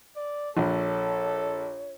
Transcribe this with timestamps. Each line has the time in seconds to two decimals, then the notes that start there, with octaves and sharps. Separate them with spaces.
0.16 D5
0.57 A#1 A4 C#5